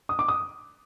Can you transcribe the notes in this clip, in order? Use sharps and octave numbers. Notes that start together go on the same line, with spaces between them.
D#6
D6
D#6